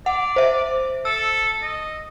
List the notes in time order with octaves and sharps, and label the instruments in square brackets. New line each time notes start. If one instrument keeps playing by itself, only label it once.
[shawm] D5 [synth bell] F#5
[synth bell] C5 E5
[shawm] A4 [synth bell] E6
[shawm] D#5